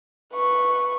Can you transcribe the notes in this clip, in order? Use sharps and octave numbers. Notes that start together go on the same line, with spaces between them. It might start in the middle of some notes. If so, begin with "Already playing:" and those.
B4 C#6